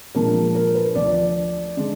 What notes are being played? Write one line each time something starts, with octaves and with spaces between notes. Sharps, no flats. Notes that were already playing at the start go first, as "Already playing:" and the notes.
A#2 F3 G#3 D4 A#4
A#4
B4
D2 D3 F3 D5
D3 G#3 D4